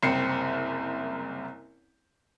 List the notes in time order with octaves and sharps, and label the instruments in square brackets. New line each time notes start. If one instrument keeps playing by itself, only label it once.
[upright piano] F#1 C2 C4 C5 C7 C#7